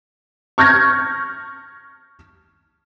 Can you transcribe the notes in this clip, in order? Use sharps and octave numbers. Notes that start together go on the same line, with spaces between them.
C#6 F6 G6 G#6 A#6